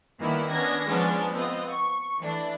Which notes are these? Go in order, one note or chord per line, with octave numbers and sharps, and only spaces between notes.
D#3 E3 G3 A#3 B3 E4
B3 C#4 D4 G#6 A#6
F3 G#3 B3 C#4 D4
B3 C4 F4 D#5
C#6
E3 A3 D4 E4